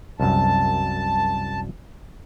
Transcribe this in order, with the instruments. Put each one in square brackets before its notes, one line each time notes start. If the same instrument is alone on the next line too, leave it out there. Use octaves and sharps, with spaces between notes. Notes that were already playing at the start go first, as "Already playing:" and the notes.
[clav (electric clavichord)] C2 F#2 [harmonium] A5